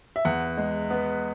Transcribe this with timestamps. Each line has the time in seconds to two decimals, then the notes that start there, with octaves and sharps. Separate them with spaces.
0.16 E5
0.25 E2 F#5
0.58 G#3
0.90 B3